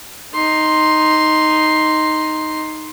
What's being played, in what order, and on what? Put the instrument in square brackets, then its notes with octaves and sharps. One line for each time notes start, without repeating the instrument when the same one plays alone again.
[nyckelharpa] D#4 C6